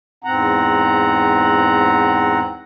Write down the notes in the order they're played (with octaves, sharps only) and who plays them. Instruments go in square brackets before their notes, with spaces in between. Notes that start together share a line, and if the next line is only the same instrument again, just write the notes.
[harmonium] E2 G#2 C4 F#5 A#5